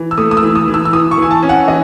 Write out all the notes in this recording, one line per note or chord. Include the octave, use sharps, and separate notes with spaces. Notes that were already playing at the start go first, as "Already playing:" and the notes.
Already playing: E3
E6
A3 D#6
D#6
E6
E3
D#6
E3
E6
E6
E3 D#6
C#6
E3 G#5
A5
C#4
F#5
E3 D#5